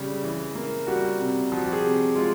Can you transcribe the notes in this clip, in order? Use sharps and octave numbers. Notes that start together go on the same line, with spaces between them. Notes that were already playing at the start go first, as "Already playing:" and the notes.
Already playing: C#3 G3
E3
A#3
G3 F#4
C3
F3 F#4
G4
G#4
C3
G#3 F4